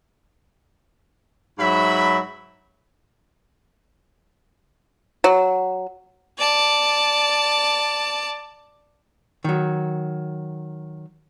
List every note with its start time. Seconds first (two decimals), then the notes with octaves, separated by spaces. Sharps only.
1.59 G#2 F#3 E5 B5
5.24 F#3
6.39 D5 A5
9.44 D#3 F#3